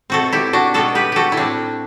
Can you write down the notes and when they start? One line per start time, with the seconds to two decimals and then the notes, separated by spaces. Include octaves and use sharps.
0.10 B2 A3 C4 F#4 A4
0.32 E4 G4
0.53 D4 F#4
0.74 B2 G3 B3 F#4 A4
0.95 G4 B4
1.12 F#4 G4 A4
1.32 E4
1.37 A2 G3 C4 D4